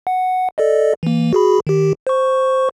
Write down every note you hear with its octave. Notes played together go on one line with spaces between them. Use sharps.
F#5
A4 D5 D#5
E3 A#3
F#4 G#4 B5
D#3 G4
C5 C#6